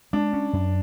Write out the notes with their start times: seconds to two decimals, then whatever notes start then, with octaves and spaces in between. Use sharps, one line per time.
0.13 G#3 D4
0.33 C#4
0.53 F#2